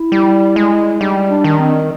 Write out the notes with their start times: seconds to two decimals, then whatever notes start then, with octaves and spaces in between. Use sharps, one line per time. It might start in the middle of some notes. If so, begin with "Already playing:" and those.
Already playing: E4
0.12 G3
0.56 G#3
1.01 G3 D#4
1.29 D4
1.44 D#3
1.59 C4